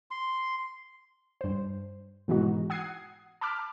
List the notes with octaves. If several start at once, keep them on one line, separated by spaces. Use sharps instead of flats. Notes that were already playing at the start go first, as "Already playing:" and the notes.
C6
G2 C5
G#2 B2 E3 G#3 D#4 F#4
F#5 D#6 G#6 C7
A5 B5 D6 F6